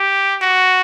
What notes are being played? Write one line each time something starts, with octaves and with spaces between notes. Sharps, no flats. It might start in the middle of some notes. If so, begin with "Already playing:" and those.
Already playing: G4
F#4